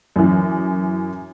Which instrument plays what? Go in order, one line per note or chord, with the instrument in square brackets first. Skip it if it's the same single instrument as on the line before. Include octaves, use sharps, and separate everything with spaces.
[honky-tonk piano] F#2 E3